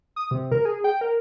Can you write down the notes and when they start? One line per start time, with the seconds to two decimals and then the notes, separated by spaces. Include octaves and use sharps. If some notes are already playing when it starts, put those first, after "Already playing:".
0.16 D#6
0.31 C3
0.52 A#4
0.65 G#4
0.84 G5
1.01 A#4